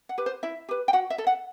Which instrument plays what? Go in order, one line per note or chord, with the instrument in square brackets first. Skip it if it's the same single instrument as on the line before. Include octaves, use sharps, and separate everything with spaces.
[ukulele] F#5
G4 B4
C5
E4 E5
G4 B4
G5
F#4 F#5
E5
A4
F#5